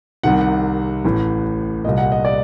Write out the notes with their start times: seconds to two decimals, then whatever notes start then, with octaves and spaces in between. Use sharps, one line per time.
0.23 C2 C3 D#3 F#5
0.41 F#5
1.05 A1 A2
1.85 C2 A#2 D#5
1.98 F#5
2.12 D#5
2.25 D5